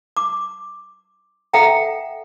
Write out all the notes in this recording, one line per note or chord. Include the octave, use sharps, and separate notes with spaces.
D6
A4 E5 F#5 G5 A#5